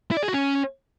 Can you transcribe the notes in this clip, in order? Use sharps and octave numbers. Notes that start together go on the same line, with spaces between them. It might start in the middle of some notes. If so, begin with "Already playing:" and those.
E4
D5
G#4
F#4
C#4